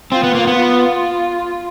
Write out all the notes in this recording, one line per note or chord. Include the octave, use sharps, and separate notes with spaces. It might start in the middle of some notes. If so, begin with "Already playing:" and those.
C4 F4
B3
A#3
B3
F4